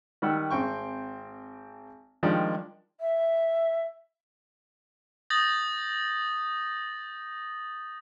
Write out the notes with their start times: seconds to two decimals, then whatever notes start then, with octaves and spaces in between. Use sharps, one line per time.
0.22 D#3 G3 F#5 E6
0.50 G#1 C4 G5 C#6
2.23 D#3 F3 G3 G#3 D4 D#4
3.01 E5
5.30 D#6 G6 A6 A#6 F#7